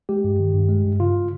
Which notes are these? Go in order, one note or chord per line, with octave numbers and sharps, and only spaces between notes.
G#3 G4
G2
D#3
G2
G#3
G2
C#3 F4